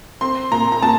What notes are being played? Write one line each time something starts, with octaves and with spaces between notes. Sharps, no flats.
C4 C6
A#2 A#5
A#5
A#2 A5